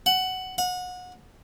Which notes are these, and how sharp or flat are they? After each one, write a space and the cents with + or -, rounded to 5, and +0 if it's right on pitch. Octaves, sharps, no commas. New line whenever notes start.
F#5 +10
F#5 -30